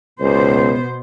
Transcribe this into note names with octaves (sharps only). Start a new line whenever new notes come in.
C#2 B2 B3 C5